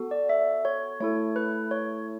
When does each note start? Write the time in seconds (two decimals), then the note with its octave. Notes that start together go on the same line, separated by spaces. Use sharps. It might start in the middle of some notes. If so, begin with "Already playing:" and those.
Already playing: B3 F#4 A4
0.11 D5
0.29 E5
0.65 C#5
1.00 A3 E4 A4 C#5
1.36 B4
1.71 C#5